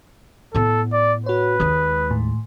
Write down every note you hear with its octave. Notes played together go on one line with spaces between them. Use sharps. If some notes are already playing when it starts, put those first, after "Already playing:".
A2 B3 A4
D5
F#4 B4 C#5
D#2 G#3 D#6
A2